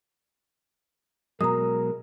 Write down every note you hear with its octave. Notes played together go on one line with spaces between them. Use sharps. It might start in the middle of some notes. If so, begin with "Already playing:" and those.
B2 F#3 G#3 A#4 A#5 D#6